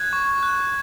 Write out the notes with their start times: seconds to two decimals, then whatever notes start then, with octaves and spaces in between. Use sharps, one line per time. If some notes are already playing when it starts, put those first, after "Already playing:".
Already playing: F#6 G#6
0.13 C#6
0.43 F#6